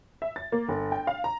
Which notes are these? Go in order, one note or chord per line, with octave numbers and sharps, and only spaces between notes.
E5
A6
A#3
G1
G5
F5
A#5